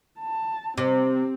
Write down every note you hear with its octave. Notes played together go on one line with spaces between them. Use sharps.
A5
C3 C4